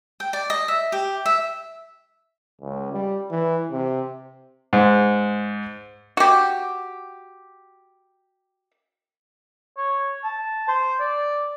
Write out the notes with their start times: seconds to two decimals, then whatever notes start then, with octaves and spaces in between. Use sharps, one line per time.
0.20 G5
0.33 D5
0.50 D#5
0.68 E5
0.92 G4
1.26 E5
2.61 C#2
2.93 G3
3.31 E3
3.72 C3
4.73 G#2
6.17 F#4 G4
9.77 C#5
10.24 A5
10.68 C5
11.00 D5